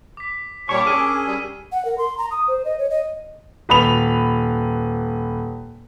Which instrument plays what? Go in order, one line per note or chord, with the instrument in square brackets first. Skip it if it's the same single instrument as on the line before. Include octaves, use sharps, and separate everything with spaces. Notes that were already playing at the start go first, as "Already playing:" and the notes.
[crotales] D6 B6
[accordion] A#2 G3 C#5 [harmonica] A5 D6 [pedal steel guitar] C#6
[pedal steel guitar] C#4 D4 A#4 [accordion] G#4 [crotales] C#6 E6 D#7
[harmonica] G3
[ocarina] F#5
A#4
C6
A#5
D#6
C5
D#5
C#5
D#5
[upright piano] D#1 B4 B5 F7